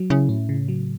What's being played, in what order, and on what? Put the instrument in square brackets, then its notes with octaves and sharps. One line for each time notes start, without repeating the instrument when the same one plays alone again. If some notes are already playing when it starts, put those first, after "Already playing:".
Already playing: [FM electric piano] F#3
[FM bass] C#3 [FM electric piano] E4
[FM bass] A2 [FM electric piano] C#4
[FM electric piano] C#3
F#3